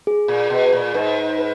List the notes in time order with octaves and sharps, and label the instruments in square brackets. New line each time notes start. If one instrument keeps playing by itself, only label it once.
[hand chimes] G#4
[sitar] A#2
B2
A#2
[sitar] G#2 [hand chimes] B4
[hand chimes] B4